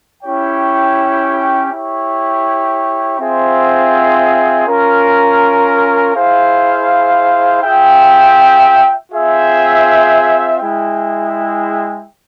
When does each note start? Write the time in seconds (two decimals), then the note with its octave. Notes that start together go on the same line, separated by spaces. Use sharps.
0.23 C#4 E4 G4 C#5 G5
1.71 E4 G4 C#5
3.18 C4 F4 G#4 C5 E5
4.67 C#4 F4 A#4
6.15 E4 G#4 C5 F5
7.62 F4 G#4 E5 G5
9.11 C4 F4 G#4 E5 G5
10.59 G#3 E4 G#4 E5 G5